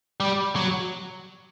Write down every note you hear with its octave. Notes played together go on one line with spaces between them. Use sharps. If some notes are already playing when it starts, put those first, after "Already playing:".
G3
F#3